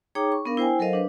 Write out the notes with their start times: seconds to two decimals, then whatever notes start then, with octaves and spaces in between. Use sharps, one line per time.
0.15 D#4 G#4 C#5 G5 A#5 D6
0.32 C#6
0.45 B3 D4 A#4 F5
0.57 E4 C5 G5 G#5
0.79 F#3 A4 A#4 C5 D#5 F5
0.93 D4 B4